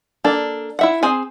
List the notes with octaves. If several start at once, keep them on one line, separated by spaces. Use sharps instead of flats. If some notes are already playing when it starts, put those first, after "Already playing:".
A#3 D4 A4
E4 E5 F#5
C4 G#4 G#5